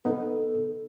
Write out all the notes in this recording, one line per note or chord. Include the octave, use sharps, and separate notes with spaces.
B3 D#4 A4